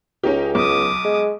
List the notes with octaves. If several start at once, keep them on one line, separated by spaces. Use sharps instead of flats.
C#2 C#4 D#4 G4
B1 D6 D#6
G#3